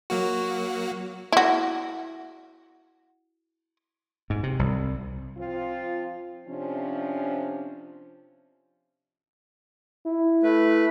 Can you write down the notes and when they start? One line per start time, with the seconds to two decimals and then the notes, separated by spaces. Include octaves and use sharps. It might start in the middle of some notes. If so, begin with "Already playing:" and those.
0.10 F#3 A#3 F#4
1.32 E4 F#4
4.30 G#2
4.43 C3
4.59 C2
5.38 F3 C4 F4
6.48 C3 F3 C#4 D4
10.06 E4
10.43 A3 B4